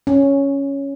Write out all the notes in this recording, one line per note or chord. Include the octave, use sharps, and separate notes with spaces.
C#4